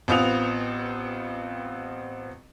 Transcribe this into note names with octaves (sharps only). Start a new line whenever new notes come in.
A1 B3 C4 F4 D#6 F7